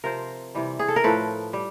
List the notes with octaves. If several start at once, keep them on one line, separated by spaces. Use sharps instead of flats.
C3 F3 A#4 C5
C3 E3 G3
G#4
A4
A#4
A2 F3 A4 B4
G3